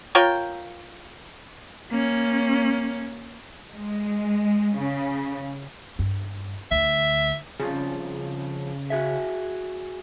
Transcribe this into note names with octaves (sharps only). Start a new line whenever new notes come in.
F4 A#4 C#5 G5
A#3 C#4
G#3
C#3
G2
D2 E5
F2 C#3 F3 G3
F#4 G#4 E5